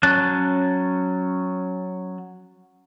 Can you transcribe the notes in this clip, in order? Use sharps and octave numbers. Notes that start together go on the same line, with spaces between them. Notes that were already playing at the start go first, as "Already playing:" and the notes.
F#3 C#4 A5 F#6